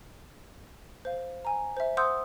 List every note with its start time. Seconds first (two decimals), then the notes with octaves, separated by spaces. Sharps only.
1.05 C5 F5
1.45 G#5 A#5
1.77 C5 E5
1.97 C5 F#5 C6 D#6 E6 G6